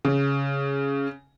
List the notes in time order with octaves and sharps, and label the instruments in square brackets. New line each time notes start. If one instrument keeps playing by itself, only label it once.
[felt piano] C#3